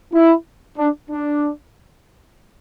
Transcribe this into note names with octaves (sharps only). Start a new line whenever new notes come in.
E4
D4
D4